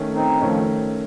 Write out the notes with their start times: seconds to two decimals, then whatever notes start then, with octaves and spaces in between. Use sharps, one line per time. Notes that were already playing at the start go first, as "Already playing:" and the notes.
Already playing: D#3 A3 C#4
0.13 C4 D#4
0.41 D#3 F3 A3 C#4